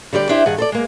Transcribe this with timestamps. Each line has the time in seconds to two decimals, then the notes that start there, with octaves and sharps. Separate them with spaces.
0.13 D3 G3 G4 D5
0.29 D4 E4 G4 C5
0.46 G2 D#3 G#4 F#5
0.58 A4 C5 D5
0.72 G#3 A#3